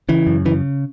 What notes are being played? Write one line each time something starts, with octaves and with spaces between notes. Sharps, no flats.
C#3 E3
F#2
C#3 E3